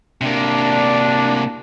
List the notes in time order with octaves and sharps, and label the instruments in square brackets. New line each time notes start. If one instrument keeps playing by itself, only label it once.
[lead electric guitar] C3 A#3 [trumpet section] D4